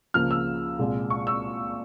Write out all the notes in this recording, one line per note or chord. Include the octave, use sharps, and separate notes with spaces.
C#2 C#3 F3 A#3 F6
E6
C2 A#2 G#3
C#6
E6